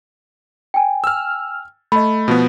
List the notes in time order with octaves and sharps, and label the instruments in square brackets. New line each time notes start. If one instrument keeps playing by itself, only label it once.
[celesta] G5 G#5
[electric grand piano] E6 F6
[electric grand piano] A3 [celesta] D#5 B5
[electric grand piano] B2 F3 B3